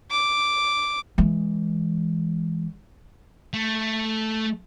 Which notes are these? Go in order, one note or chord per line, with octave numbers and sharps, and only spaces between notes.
D6
E3 G#3
A3